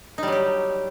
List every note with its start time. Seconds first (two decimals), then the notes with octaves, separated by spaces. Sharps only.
0.18 D#4
0.23 G3
0.28 F#3
0.32 G4